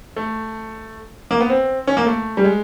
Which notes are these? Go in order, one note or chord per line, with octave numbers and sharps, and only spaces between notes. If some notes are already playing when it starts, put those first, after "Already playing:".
A3
A#3
B3
C4
C#4
A#3
A3
G3
G#3